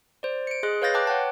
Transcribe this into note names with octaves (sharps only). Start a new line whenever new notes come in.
C5 D5
C#7 D7
G#4 D#5 C6 F#6
B4 C#5 F5 G6 A6 A#6
B4 G5 A5 D6 F#6
C#5 F#5 G5 A5